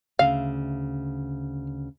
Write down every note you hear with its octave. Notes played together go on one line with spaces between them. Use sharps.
D2 C#3 E5 F5